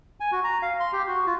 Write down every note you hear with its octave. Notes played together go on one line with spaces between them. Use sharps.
G#5
F#4
A#5
F5
C6
G4
F#4
F4